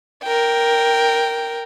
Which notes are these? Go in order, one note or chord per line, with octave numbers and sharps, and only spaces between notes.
A#4 G5